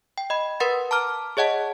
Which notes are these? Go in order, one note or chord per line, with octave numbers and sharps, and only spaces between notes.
G5
D#5 B5
A#4 B4 F#5 C6 A6
A5 A#5 D6 F6
G#4 C#5 D#5 F#5 A5